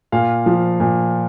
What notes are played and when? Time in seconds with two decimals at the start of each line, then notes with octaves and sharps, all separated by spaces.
0.12 A#2 F5
0.46 F3
0.80 A#2